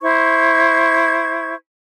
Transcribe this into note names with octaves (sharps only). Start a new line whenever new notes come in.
E4 C5 C#6 G#6